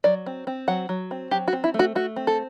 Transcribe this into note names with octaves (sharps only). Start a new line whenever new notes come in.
F#3 D5
C4
C4
F#3 F#5
F#3
C4
F#3 G4
F#4
C4
E4
A3
F#4
A3 F#4
C4
A4